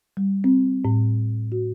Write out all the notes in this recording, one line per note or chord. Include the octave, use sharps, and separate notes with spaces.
G3
C4
A2
F#4